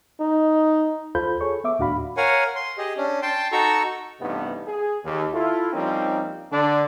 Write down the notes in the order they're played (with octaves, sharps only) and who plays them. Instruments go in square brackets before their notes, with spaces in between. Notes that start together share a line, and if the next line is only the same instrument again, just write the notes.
[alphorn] D#4
[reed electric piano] D#2 F4 A4 C5 B5 G6
G#4 A4 C#5 C#6
B3 E5 D6
D#2 A2 D4 F#4 F5 B5
[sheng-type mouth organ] A#4 C#5 F5 F#5 G#5
C6
G4 G#4 D#5
C#4 D4
G5 A5 C6
D#4 F#4 A4 A#5 C#6 E6
[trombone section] A1 G2 C3 B3 D#4
G#4
D#2
E4 F4 A4
F3 G3 A#3 C4 C#4 D#4
D3 D4